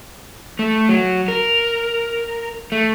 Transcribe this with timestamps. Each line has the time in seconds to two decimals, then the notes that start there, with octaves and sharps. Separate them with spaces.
0.59 A3
0.89 F#3
1.28 A#4
2.72 A3